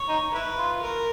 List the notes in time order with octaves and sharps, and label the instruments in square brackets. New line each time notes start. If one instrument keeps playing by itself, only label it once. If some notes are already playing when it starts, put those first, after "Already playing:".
Already playing: [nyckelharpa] C#5
[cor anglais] D#4
[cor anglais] E4 [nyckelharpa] B4
[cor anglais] F4
[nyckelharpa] A#4